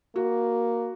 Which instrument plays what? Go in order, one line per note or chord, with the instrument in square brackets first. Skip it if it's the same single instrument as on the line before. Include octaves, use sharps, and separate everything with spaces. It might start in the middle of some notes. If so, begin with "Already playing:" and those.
[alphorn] A#3 [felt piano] F#4